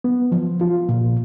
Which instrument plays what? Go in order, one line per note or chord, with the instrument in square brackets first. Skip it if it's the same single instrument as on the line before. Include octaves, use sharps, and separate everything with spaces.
[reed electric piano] B3
F3
F4
A#2